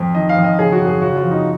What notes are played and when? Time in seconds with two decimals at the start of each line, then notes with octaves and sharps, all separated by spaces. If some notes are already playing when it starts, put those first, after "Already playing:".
Already playing: F2
0.15 D#3 D#5
0.29 F5
0.36 F2
0.44 D#5
0.58 C#3 G#4
0.72 F#4
0.79 F#2
0.87 G#4
1.01 C#3 F#4
1.16 F4
1.23 F2
1.31 D#4